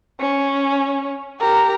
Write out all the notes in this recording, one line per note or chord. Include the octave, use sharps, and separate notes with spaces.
C#4
G4 A#4